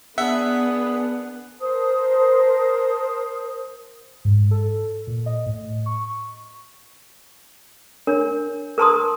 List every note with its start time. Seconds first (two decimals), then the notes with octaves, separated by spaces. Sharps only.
0.18 B3 D4 G#4 E5 F#5
1.59 A#4 C5 A5 D#6
4.25 G#2
4.51 A4
5.07 A#2
5.26 D#5
5.46 A2
5.86 C#6
8.07 D4 A#4 C#5
8.78 A#4 B4 A5 A#5 C6 D#6